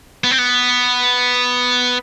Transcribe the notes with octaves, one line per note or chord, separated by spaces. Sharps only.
B3
C4
B3